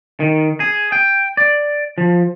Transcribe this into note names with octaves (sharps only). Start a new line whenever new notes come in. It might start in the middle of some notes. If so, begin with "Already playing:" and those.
D#3
G#4
G5
D5
F3